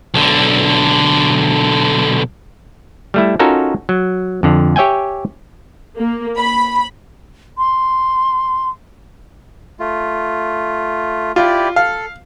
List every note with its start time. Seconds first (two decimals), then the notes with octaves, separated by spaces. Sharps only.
0.14 B1 D3
3.14 G3 A3 E4
3.39 C#4 D#4 F4 F#4 A4 A#4
3.89 F#3
4.43 F2 D3
4.76 G4 C#5 E5 G5 G#5
5.96 A#3
6.38 B5
7.58 C6
9.80 A3 F4
11.36 E4 F4 G4 D5
11.76 A4 F5